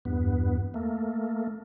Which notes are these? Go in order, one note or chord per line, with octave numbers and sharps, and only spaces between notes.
E2 G2 B3
A3 A#3